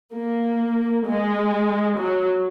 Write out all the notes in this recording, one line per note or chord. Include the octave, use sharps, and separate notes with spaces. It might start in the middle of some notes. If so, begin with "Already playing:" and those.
A#3
G#3
F#3